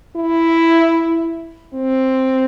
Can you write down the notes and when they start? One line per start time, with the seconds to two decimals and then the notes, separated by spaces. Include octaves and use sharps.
0.16 E4
1.74 C4